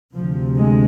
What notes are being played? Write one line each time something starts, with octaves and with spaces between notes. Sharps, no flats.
D2 C3 F3
G#3